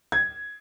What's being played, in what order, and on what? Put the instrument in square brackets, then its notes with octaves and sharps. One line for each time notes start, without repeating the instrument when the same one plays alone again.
[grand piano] G#6